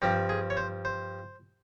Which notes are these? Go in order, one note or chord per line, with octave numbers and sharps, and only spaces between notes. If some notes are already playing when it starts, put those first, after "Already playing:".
G2 F3 C4 G4
G#4
C#5
C5
C5